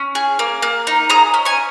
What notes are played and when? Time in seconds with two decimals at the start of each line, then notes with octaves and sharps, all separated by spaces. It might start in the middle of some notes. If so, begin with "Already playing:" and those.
Already playing: C#4
0.15 G#4
0.39 A#3
0.62 A#3
0.87 D#4
1.10 G#4 A#5 D#6
1.34 C#4
1.45 G#5 C#6